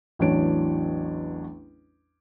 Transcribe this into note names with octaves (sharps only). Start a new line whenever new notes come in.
A1 E2 F#3 D4 C#5 D7